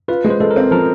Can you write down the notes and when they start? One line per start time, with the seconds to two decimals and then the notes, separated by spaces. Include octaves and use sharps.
0.08 F4 B4
0.24 G#3
0.30 C5
0.40 G#3 A4
0.51 A#4
0.56 C4
0.71 F3 A#4